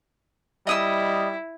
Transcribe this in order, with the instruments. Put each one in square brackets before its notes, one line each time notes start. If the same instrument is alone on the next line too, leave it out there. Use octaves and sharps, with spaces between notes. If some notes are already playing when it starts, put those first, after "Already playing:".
[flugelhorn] G3 [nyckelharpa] E4 [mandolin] D#5 D#6 E6